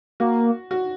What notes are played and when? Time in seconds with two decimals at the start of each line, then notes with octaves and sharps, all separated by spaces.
0.20 A#3 F#4
0.71 F#4